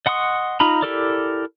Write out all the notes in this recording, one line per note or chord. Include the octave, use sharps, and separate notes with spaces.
D#5 F#5 C6 C#6 D#6
D#4 F4 A#5 B5
E4 G4 A4 A#4 D5